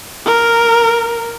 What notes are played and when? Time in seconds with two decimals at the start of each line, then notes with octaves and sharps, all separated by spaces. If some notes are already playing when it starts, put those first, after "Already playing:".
0.26 A#4